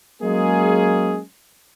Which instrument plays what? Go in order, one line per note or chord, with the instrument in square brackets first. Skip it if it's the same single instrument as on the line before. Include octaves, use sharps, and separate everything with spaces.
[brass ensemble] F#3 G#3 A#3 C#4 G#4